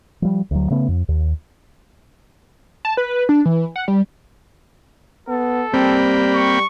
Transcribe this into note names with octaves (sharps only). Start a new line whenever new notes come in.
F3 G3
D2 F#3
C#3 A3 B3
F2
D#2
A5
B4
D4
E3
F#5
G3
B3 A4
G3 A#3 C4 G5 B5
C#6